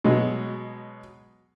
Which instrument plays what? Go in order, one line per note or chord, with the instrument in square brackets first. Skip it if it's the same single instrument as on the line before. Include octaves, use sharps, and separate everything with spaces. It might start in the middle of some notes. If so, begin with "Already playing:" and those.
[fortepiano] B2 F#3 G#3